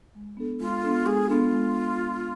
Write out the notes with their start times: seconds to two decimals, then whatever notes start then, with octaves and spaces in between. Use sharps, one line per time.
0.15 G#3
0.37 B3 D4 A4
0.60 G#3 F4
0.83 B3 D4 A4
1.06 G#3 G#4
1.29 B3 D4 F4 A4
1.53 G#3